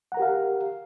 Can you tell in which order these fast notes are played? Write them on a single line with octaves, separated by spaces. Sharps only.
F#5 A#5 A#4 G4 F5